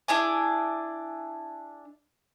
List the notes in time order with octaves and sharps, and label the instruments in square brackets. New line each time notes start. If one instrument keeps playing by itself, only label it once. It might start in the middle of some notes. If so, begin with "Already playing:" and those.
[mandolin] D4 E4 G#4 G#5